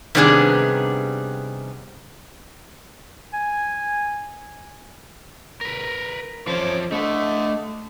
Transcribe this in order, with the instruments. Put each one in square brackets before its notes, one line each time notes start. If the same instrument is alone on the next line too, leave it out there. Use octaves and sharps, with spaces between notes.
[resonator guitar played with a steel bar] C3 D#3 G3 B3 D4 G#4
[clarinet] G#5
[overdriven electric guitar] A#4 B4
[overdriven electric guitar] F3 A4 [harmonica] C#4 C5 D6
[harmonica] D3 D#5 [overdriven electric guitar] A3